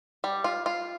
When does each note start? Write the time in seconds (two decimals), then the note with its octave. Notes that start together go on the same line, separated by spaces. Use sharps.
0.24 G3
0.44 F4
0.66 F4